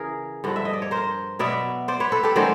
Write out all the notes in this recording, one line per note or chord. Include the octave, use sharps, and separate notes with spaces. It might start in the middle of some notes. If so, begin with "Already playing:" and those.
Already playing: C#3 E3 G#4 A#4
G2 D3 F3
E5
D#5
D5
C#5
A#4 C5
B2 F#3 B3 D5 E5
C5 D5
B4 C#5
A4 B4
G4 A4
D#3 F#3 A3 C#4 C5 D5